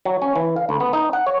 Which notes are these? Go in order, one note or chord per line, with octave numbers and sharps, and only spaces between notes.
F#3
C#4
E3
F5
D2
B3
D#4
F#5
C#5